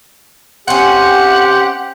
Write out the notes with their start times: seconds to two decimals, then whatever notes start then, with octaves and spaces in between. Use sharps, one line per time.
0.68 C4 C#4 G4 F#5